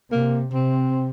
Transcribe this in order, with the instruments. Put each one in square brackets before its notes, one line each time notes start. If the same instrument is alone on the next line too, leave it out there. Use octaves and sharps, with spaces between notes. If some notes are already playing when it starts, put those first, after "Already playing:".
[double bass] C3 [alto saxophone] A#3
[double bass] C3 [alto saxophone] C4